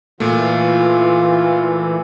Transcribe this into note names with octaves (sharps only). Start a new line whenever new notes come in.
A#2 E3 A3 F4